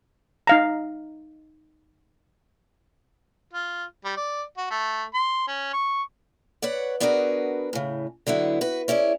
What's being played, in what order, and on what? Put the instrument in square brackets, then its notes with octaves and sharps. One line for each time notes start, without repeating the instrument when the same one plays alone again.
[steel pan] D#4 F5 A#5
[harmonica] F4
G3
D5
F#4
A3
C6
C#4
C#6
[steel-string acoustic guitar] B4 C#5 D5 F#5
B3 D4 F#4 G#4 A#4 B4
A2 C#3
D3 F#3 B3 E4
F#4 B4
C#4 E4 G#4 D5